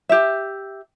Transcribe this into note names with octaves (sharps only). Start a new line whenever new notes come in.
G4 E5